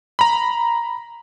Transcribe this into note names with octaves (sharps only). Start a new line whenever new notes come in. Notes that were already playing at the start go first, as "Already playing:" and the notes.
A#5 B5